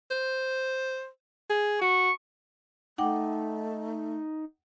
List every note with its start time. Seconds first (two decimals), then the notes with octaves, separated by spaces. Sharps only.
0.11 C5
1.49 G#4
1.81 F#4 C#6
2.98 A3 D#4 F#5 G5 D6